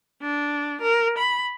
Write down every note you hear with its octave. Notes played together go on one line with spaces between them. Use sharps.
D4
A#4
B5